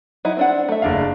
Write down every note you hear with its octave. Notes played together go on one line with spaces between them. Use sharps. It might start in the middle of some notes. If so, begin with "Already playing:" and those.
F#3 D#4 E4
C4 D4 F#5
A3 E5
F#1 D4 F5